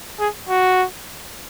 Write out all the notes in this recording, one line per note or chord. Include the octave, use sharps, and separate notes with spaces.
G#4
F#4